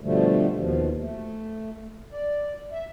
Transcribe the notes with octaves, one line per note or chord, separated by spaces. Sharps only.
B2 D3 F3 G3 A3
D#2 B2 F3
A3
D5
E5